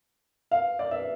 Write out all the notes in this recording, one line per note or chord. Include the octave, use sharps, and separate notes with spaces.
F5
D5
E5